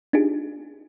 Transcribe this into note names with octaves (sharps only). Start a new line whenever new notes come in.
D4 D#4 F4 G4 G#4